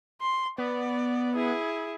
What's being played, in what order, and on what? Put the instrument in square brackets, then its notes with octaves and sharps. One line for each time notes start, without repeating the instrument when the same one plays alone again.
[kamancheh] C6
[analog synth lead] B3 [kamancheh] D5
[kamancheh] E4 G#4